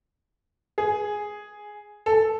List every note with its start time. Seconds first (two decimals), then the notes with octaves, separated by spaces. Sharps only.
0.78 G#4
2.06 A4